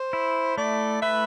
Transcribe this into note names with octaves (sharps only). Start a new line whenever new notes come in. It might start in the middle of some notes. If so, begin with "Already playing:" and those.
Already playing: C5
E4
A3 D5
B4 E5